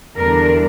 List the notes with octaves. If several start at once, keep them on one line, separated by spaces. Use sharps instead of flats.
E2 D3 G3 D4 A#4